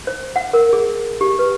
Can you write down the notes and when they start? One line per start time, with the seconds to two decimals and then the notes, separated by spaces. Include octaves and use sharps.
0.07 C5
0.36 F#5
0.53 A#4
0.73 G#4
1.21 G4
1.39 B4